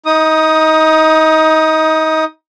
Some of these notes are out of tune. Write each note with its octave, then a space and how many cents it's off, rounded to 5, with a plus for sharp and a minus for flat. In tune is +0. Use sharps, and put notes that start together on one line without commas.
D#4 +25 D#6 +0